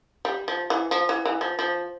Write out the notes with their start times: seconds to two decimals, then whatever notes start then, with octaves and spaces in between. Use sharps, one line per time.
0.25 G3
0.48 F3
0.70 E3
0.91 F3
1.09 E3
1.25 E3
1.41 F3
1.59 F3